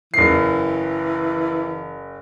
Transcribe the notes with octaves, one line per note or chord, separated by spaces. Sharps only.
F#1 E3 C7